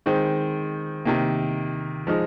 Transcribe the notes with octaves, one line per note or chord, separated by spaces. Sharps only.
D#3 G#3 C4
C3 D#3 A#3
F3 G#3 D#4